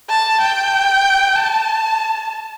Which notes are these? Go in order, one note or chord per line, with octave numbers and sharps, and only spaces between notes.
A5
G5
A5